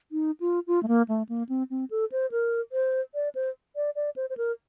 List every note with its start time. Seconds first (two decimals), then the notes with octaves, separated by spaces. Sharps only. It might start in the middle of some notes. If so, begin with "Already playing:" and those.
0.12 D#4
0.40 F4
0.67 F4
0.83 A3
0.88 A#3
1.08 A3
1.29 A#3
1.49 C4
1.70 C4
1.91 A4
2.12 C5
2.32 A#4
2.72 C5
3.15 D5
3.35 C5
3.76 D5
3.96 D5
4.16 C5
4.30 C5
4.37 A#4